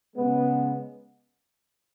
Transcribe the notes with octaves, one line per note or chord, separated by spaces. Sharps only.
C#3 G#3 B3